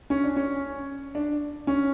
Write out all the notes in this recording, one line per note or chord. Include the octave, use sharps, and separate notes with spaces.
C#4
D4
C#4
D4
C#4